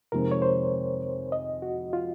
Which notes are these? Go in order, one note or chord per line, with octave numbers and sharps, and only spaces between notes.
F2 C3 D#3 G#3 C4 A#4
C#5
C5
D#5
F#4
F4